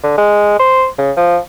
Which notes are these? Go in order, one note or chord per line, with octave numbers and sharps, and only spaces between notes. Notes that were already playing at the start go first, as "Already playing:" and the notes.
D3
G#3
C5
C#3
F3